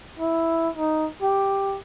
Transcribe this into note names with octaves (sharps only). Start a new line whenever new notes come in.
E4
D#4
G4